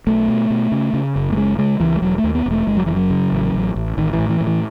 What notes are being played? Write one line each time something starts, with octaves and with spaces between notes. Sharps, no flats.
B1 A3
B2
B2
C#3
C#3
F#1
A3
C#3 G#3
C#3 G#3
C#2 E3
G#3
E1 F#3
A3
D#2
B3
E1
A3
F#1 G#3
F#3
F#2 E3
F#3
C#3
A1
A1
A1
A1 D#3
E3
A2
E3
A2
E3